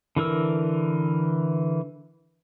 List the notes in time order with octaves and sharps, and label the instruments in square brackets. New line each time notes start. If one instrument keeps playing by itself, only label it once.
[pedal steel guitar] D3 E3 A#4 E6